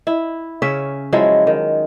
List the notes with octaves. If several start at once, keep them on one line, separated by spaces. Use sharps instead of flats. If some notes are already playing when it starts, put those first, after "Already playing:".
E4
C#3 C#4 E5
F3 F#3 G#3 E4
D#3